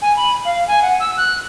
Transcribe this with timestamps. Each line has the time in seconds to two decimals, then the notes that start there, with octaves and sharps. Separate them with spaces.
0.02 G#5
0.17 B5
0.45 F5
0.68 G#5
0.82 F#5
1.00 E6
1.17 F#6